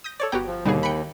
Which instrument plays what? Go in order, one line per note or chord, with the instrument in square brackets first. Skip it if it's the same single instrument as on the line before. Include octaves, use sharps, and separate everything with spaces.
[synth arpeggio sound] D#6 G6 A#6
[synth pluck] A4 C#5 D5
[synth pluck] G1 B3 G5 [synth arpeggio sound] F#4 G4 A#5
[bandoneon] F3
[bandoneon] D#2 [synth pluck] B2 D3 D#4 [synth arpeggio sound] G3 B3 G#4
[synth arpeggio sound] G5 F#6 [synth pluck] B5 C#7